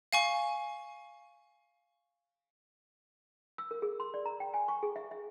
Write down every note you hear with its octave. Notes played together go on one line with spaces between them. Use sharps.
F5 G#5 C#6
E6
A#4
G#4
C6
D5
A#5
G5
G#5
C#6
G#4
E5
E5